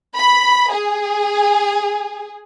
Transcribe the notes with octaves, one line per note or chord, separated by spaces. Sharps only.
B5
G#4